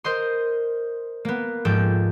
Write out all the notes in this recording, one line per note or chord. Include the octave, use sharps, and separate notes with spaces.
A#4 C5 D#5 C6
A#3 B3
G#2 F3 A4 G5